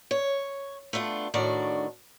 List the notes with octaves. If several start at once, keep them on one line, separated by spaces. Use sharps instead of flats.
C#5
A3 B3 D4 F4
A2 D#3 D4 F#4 D5